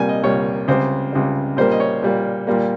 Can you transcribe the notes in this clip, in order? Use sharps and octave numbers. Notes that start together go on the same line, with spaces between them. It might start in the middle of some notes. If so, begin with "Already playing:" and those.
Already playing: C2 A#2 G3 A#3 G#5
D#5
C2 A#2 G3 A#3 C#5
C#2 C3 G3 C5
C#2 C3 G3
A#2 G3 A#3 C5
D#5
C#5
A#2 G3 A#3
A#2 G3 A#3